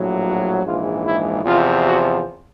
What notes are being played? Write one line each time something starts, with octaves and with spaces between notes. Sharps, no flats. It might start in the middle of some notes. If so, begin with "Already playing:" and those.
Already playing: A#1 A2 F#3
F#4
A#1 G#2 E3 G#3 F4
E4
E2 C3 F3 F4
F#4